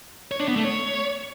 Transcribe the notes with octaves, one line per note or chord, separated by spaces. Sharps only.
C#5
D4
B3
A3
C#5